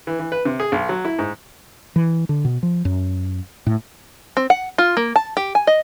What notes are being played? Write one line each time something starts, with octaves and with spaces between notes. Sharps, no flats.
E3
E3
B4
C3
G#4
B1
F#3
E4
G#2
E3
D3
B2
F3
F#2
A2
C4
F#5
F4
A#3
A5
G4
G#5
D#5